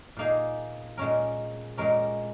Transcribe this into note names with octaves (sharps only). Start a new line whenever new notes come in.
A#2 A#3 D#4 G#4
A#2 G#3 C#4 A#4
A#2 G#3 C#4 A#4